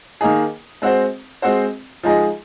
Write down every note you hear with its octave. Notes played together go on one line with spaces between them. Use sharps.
D#3 A#3 D#4 G#4
G#3 C4 F#4 C5
G#3 C4 F#4 C5
F3 G#3 D#4 G#4 D#5